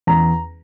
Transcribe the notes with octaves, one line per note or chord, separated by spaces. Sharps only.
E2 A#5